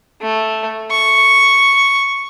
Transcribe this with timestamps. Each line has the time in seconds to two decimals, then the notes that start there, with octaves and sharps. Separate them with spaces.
0.22 A3
0.91 C#6